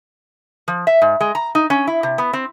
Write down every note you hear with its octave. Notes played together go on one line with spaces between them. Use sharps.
F3
E5
G#2
G#3
A#5
D#4
C#4
E4
C3
B3
C4